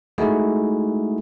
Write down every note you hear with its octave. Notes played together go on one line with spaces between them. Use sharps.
G#3 A3 D#4 E4 F#4 G#4